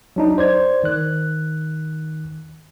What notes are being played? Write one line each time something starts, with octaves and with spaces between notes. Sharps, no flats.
F#3 D4 D#4
C5 D5 G#6
D#3 F#6